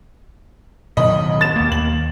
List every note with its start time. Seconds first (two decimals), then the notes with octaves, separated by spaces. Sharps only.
0.97 B2 D#3 F#3 D#5 B5
1.41 A6 E7
1.56 D#2 A#3
1.72 F#7